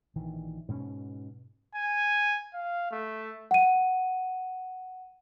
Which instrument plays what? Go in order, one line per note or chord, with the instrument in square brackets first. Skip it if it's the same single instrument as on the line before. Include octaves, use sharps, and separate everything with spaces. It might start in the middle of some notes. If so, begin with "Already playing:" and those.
[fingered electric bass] A#1 D#3 E3
G#2 B2 B3 C#4
[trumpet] G#5
F5
A3
[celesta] F#5 D#7